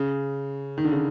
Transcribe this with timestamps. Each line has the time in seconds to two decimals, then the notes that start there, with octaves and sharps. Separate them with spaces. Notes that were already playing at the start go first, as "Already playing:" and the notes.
Already playing: C#3
0.78 D#3
0.85 D3
0.91 C#3